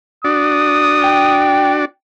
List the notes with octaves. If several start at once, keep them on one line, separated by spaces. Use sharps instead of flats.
D4 F#4 D5 D#6
G5